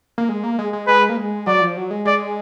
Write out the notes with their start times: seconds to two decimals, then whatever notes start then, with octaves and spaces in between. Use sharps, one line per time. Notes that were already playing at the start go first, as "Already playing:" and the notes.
0.18 A#3
0.29 G#3
0.44 A#3
0.59 G#3
0.73 G#3
0.87 G#3 B4
1.09 A#3
1.17 G#3
1.47 F#3 D5
1.61 F3
1.77 F#3
1.90 G#3
2.05 G#3 D5